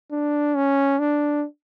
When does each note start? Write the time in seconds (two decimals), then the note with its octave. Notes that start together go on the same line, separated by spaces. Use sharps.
0.11 D4
0.56 C#4
0.99 D4